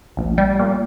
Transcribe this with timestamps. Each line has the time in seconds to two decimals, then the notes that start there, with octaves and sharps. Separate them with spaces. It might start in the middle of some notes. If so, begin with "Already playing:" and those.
0.17 A#1
0.38 G3
0.59 A#2